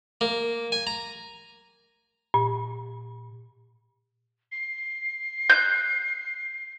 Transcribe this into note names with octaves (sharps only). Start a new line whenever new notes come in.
A#3
G#5
A#5
A#2
C7
F#6 G6